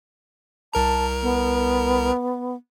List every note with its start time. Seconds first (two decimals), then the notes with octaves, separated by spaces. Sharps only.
0.74 C2 A#4 A5 A#5
1.22 B3